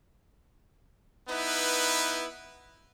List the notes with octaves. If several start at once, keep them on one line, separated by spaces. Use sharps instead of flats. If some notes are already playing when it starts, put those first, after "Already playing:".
B3 D#4 E4 B4